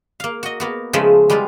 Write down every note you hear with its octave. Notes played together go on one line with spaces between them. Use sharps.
A#3 F5
F#4 D#5
A#3 B3 F#4
C#3 F3 G#3 A3 G#4 B4
G3 G#3 B3 F4 G4